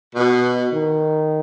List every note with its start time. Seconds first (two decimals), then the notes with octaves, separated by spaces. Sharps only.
0.16 B2
0.70 D#3